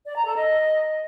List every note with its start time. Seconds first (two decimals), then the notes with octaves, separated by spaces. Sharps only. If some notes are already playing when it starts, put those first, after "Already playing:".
0.06 D5
0.16 A#5
0.26 A4
0.36 D#5